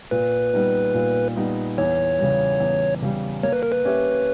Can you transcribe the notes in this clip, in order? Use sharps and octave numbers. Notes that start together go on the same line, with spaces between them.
A#2 B4
G3 B3 D#4
A#2
G3 B3 D#4
E2 C#5
C#3 G3
E2
C#3 G3
A#3 C#5
B4
A#4
B4
C#4 G4 C#5 E5